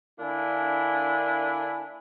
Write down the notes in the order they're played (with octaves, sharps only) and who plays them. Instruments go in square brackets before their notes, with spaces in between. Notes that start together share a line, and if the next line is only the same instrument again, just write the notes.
[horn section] D3 A#3 D4 E4 G#5